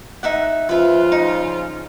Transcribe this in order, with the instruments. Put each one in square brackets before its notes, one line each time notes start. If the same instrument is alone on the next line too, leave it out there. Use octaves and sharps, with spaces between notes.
[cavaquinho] D#4 E5 F#5
[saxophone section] C#3 F3 F4 [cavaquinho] B4 E5
[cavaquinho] D#4